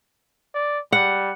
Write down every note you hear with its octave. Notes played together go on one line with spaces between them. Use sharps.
D5
G3 F#5